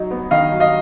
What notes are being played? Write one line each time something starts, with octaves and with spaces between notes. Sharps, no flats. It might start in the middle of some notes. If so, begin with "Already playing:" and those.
Already playing: F#3 D#4
B3
D#3 D#5 F5
F#3
D#5 F5